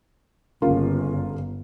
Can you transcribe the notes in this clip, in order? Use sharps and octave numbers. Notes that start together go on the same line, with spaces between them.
G1 C#3 A#3 F4